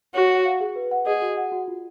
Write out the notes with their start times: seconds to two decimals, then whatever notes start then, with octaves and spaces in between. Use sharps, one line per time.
0.15 F#4 C#5
0.30 F#5
0.45 F5
0.60 G#4
0.76 B4
0.91 F#5
1.06 G#4 D#5
1.22 F#4
1.37 F#5
1.52 F#4
1.68 F4